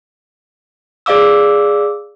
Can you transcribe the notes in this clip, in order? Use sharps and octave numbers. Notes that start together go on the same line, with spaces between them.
G#4 D5 F5 D6 E6